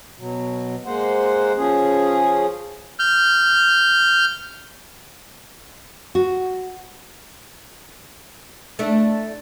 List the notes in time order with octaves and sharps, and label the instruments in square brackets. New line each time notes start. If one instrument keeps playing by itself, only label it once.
[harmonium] B2 F#3
G#3 A#3 C5 F#5
F3 C#4 G#4
[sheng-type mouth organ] F6 G6
[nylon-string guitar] F#4
[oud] A3 D4 E4